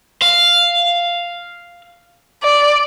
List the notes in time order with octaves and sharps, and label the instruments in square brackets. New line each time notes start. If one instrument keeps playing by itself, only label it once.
[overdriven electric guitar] F5
[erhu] D5